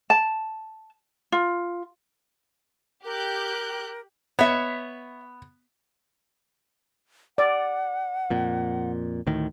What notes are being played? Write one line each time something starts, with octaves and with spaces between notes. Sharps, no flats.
A5
F4
G4 A#4 F#6 G6
B3 C#5 E5
D5 F#5
F2 A#2
D2 A2 D#3